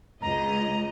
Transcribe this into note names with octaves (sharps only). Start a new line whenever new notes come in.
C#2 D#5 A#5